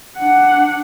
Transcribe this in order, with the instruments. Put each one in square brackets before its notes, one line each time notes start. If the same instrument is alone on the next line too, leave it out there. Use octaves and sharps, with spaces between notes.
[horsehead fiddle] D4 F#5